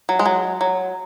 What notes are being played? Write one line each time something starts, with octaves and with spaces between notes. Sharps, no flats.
F#3
G#3
F#3
F#3